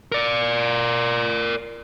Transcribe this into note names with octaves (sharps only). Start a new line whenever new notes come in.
A#4 D5